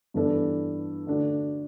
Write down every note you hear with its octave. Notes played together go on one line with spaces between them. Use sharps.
G2 E3 B3 D4 A4
D3 A3 D4 F#4